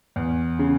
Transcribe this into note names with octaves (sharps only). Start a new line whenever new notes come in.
E2
C#3